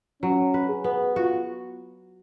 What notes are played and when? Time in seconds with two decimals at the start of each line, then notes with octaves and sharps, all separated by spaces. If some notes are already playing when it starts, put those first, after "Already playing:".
0.22 F#3 C#4
0.54 B4
0.69 G#4
0.84 B3
1.16 F4 F#4